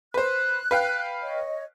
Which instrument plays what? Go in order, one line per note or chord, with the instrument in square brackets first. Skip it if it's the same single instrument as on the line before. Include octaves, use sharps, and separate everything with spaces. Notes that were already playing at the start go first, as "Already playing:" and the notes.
[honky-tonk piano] B4 C5 [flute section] F#6
[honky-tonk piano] B4 F5 G5
[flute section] C#5 D#5